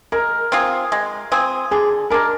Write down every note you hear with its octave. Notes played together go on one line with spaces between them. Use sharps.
G#3 A#4
C4 F4 G#4
G#3
C4 F4 G#4
D3 G#4
G#3 D4 A#4